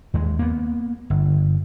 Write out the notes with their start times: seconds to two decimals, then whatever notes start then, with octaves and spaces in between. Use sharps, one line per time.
0.14 D#2 G#3
0.39 A#3 B3
1.10 G1